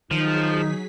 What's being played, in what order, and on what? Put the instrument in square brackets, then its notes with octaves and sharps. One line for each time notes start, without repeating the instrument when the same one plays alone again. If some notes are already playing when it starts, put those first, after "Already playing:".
[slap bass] D#3 [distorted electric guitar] F3 [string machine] F#3 G#4 B6 [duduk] D#4